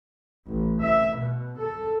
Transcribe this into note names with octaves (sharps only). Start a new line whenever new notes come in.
A1
E5
B2
A4